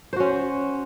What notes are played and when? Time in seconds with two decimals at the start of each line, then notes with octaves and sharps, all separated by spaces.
0.13 C5
0.16 F#4
0.20 C#4